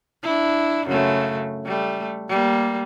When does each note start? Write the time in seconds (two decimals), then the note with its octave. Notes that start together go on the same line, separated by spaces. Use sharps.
0.23 D4 E4
0.87 F#2 C#3 A3
1.65 G3 A3
2.29 G3 A#3